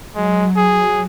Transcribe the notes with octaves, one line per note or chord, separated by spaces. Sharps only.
F#3 G#3
G#4